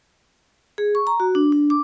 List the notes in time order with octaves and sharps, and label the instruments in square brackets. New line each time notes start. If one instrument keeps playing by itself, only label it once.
[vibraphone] G#4
C#6
A#5
F#4
D4
D4
D6